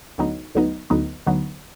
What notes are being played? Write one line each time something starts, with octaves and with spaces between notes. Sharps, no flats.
D2 D3 F#3 B3 D#4
D2 D3 F#3 B3 D#4
D2 D3 F#3 B3 D#4
D2 D3 F#3 B3 D#4